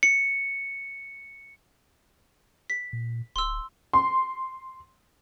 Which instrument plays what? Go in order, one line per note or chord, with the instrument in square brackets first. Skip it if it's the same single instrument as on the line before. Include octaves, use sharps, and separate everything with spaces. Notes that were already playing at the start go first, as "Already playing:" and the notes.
[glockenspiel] C#7
[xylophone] B6
[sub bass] A#2
[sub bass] D1 [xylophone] C6 E6
[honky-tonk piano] C6